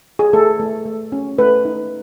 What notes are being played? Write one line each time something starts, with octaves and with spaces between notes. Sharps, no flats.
G#4
A3 A4
A3
A3
C#4
A3 B4
D#4